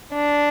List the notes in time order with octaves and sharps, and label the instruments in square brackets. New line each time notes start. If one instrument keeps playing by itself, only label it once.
[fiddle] D4